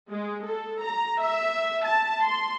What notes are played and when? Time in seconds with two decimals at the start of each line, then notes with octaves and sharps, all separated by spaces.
0.11 G#3
0.47 A4
0.85 A#5
1.22 E5
1.86 A5
2.24 C6